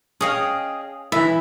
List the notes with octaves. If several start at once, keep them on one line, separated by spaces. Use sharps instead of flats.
C#4 G#4 D#5 F5 G5
E3 E4 E5